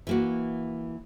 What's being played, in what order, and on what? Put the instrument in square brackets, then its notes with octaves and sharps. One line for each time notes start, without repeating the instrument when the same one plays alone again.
[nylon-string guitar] E3 A#3 F#4